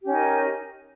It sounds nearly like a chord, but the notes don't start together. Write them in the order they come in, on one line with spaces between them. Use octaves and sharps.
G4 C#4 D#4 A#4